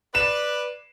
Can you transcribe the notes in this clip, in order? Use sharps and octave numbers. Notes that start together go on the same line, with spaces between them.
B4 D5 E7